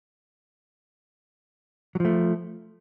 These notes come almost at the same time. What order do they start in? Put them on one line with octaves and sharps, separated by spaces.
F#3 F3 A3